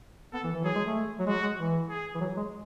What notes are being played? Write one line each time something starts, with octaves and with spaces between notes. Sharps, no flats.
B3 A4
E3
E3
F#3 G#4
G#3
A3
F#3
G#3 F#4
G#3
E3
G#4
E3
F#3
G#3